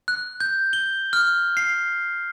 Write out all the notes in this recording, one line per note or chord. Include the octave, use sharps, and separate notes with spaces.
F#6
G6
G7
F6
C7